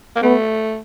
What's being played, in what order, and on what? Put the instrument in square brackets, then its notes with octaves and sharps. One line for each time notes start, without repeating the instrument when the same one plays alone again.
[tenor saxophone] A#3
[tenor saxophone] A3 [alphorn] B3